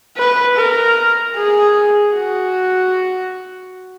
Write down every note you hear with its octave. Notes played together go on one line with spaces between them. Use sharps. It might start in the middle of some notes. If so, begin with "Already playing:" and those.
B4
A#4
G#4
F#4